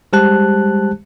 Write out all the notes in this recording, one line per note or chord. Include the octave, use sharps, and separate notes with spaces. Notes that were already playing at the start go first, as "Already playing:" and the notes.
G3 G#3 G4 C5 A5 F#6